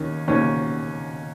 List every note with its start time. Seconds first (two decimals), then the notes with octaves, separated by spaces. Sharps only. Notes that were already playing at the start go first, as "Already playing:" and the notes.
Already playing: D#2 D#3 C#4
0.28 D#2 D#3 C#4